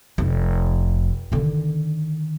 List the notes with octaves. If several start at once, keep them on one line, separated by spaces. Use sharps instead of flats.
F1
D3 D#3